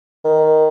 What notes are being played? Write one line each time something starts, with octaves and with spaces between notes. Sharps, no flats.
D#3